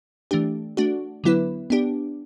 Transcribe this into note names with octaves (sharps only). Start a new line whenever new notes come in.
E3 A3 D4 G4
A3 D4 F#4
D3 F#3 B3 E4 B4
B3 D4 G4